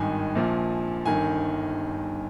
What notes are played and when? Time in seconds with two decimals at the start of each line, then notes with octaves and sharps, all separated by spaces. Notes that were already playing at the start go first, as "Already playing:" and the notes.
Already playing: G#1 G2 D#3 G#5
0.35 A#1 A#2 F3
1.06 G1 G2 D#3 G#5